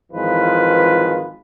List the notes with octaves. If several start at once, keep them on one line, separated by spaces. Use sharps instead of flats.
G#1 E3 F3 G#3 F4 B4